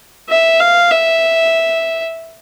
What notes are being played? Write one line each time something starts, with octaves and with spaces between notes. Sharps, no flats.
E5
F5
E5